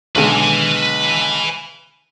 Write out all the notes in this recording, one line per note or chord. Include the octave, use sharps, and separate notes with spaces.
B1 D3 G#3 B4 G#5